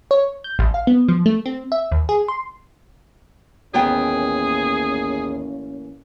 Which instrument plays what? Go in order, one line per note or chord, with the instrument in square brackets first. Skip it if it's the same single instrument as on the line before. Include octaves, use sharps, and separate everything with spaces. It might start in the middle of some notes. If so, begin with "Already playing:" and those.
[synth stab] C#5
G6
A1
F5
B3
F3
A3
C4
E5
D#2
G#4
C6
[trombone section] A1 A#3 C#4 [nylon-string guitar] D#2 B3 G5 [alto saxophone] G#4